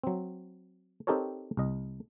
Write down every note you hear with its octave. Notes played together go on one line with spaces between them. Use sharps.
F#3 C4
C4 D#4 G4 A4 A#4 C#5
C2 D#5